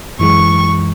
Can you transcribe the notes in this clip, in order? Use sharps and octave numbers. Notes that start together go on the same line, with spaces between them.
F#2 E3 G#3 C#6